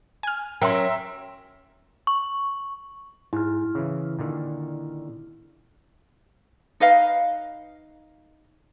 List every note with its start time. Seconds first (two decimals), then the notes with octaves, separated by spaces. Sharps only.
0.23 G#5 F6
0.61 F#3 C#4 A#4 E5 G5 C6
2.07 C#6
3.33 G#2 E4 F6
3.75 C#3 E3
4.19 A#2 D3 D#3
6.80 D#4 B4 D#5 F5